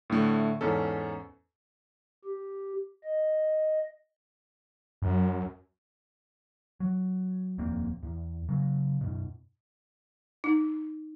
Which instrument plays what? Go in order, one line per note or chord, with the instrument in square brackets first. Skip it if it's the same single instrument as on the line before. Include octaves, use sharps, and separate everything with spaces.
[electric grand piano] A2 D3 A3
E2 G#2 C#4 A4
[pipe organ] G4
D#5
[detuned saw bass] F#2
[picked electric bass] F#3
D#1 F2 A#3 C4
E2
C#3 F#3
F#2 B2
[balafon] D#4